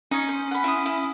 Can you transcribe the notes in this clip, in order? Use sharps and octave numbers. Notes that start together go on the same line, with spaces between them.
C#4 D#4 C#5
C5
F#5 B5
E4 C6 D#6
E4